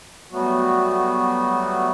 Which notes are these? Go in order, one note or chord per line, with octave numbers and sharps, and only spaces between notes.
F#3 G3 A3 B3 F#4